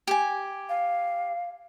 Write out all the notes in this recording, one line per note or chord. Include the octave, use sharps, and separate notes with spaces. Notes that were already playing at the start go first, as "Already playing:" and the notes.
G4 G#5
F5